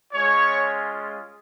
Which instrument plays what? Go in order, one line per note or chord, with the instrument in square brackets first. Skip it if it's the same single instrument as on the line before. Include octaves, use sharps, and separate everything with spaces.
[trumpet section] G#3 C#4 F4 C#5